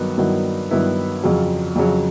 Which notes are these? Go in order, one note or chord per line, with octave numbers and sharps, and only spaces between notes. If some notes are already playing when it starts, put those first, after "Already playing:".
Already playing: G2 D#3 F#3 B3
G2 D#3 F#3 B3 E4
G2 D#3 F#3 B3 E4
F2 C#3 F#3
F2 C#3 F#3